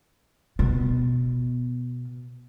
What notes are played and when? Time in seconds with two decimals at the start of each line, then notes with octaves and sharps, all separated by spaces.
0.59 B2 B3